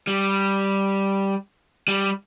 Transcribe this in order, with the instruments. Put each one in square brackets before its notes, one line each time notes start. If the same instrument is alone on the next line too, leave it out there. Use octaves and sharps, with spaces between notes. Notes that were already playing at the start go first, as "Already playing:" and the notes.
[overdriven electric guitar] G3
G3